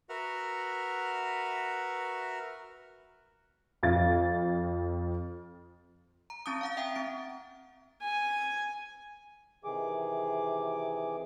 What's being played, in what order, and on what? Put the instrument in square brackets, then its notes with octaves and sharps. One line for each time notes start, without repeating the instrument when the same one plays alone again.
[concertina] F#4 A#4 B4 E5 F#5 F6
[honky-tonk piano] F2 F5 A6
[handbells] A#5
C4 C#4 A5 D#6
F5 F#5 D#6
E5 F#5 G5 A#5 D#6
C4 D7
[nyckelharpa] G#5
[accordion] C3 D#3 E3 G#4 D6